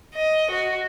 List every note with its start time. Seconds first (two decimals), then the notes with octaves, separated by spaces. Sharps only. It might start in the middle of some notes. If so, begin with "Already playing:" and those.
0.13 D#5
0.50 F#4